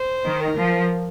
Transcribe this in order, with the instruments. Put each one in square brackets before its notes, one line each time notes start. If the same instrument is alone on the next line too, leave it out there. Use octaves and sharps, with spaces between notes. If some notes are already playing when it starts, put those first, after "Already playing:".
Already playing: [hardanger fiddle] C5
[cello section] D#3
[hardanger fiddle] A#4
[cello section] F3